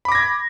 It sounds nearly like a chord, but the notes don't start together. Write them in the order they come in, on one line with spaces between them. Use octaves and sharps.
B5 D6 A#6 G#6